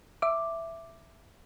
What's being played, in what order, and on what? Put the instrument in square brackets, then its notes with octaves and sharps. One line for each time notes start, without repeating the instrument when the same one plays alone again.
[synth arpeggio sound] E5 D6